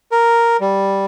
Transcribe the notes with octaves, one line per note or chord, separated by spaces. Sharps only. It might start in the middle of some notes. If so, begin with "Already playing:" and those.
A#4
G3